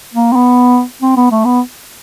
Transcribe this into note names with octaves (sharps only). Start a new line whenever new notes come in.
A#3
C4
B3
C4
B3
A3
B3